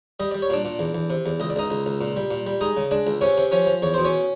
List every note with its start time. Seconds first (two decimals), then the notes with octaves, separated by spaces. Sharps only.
0.20 G3 D#5
0.31 G3 D5
0.42 C#5
0.50 A#2 D4 D5
0.65 A#2
0.79 E2
0.94 E2
1.10 C3
1.26 E2
1.40 C#2 D#5
1.50 D5
1.56 C#2 D#4 D#5
1.71 C#2
1.86 C#2
2.01 A#2
2.17 G3
2.31 A#2
2.47 G3
2.61 G#3 D#4 D#5
2.77 C#3
2.91 G#3 D4 D5
3.07 C#2
3.21 C3 C#4 C#5
3.38 C3
3.52 F3 C#4 C#5
3.67 F3
3.82 E2 C#5
3.94 B2 C5
4.05 C#4 C#5